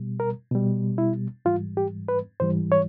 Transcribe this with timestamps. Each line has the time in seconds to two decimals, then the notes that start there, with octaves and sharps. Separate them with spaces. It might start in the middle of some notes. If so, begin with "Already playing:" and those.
Already playing: B2 G3
0.20 A#4
0.51 B2 G3
0.98 E4
1.45 G#2 E3 G3 F4
1.77 G4
2.08 B4
2.40 G#2 E3 G3 C5
2.72 C#5